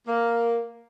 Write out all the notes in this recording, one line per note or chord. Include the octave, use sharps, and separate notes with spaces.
A#3